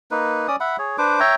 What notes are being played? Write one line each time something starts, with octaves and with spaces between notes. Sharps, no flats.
A#3 D#4 B4
C#4 D5 D#6
E5 F#5 B5
G#4 C#5
D4 B4 C5 D6
C#5 E5 G5 A#5